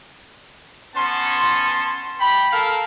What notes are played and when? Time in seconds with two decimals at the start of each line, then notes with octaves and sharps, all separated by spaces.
0.95 B3 C#4 A5 C6
2.18 G5 B5
2.51 A4 A#4 F5